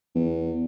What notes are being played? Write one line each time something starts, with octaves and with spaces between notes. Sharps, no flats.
E2